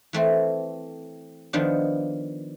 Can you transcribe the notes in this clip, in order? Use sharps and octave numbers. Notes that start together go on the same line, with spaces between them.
E3 A3 C4
D#3 F3 B3 D4